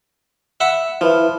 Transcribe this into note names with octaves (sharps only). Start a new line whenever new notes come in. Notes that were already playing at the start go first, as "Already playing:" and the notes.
E5 F#5 B5
F3 E4 B4 E5